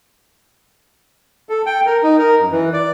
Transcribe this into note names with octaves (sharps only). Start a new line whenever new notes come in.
A4
G5
A#4
D#4
A#4
F#2
E3
D5